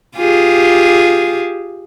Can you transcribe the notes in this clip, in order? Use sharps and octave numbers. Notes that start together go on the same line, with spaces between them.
F4 G4 G#4